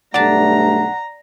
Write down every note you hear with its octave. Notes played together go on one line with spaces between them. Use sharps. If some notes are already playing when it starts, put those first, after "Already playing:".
B1 G2 A3 D5 F#5 A5 A#5